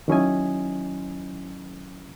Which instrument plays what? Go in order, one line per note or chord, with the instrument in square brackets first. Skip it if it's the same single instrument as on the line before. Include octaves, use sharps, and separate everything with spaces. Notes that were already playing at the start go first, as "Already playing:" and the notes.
[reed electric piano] D#3 F#3 C#4 E4 D#5 G#5